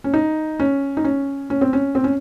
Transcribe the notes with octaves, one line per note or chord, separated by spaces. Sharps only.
C#4
D#4
C#4
D#4
C#4
C#4
C4
C#4
C4
C#4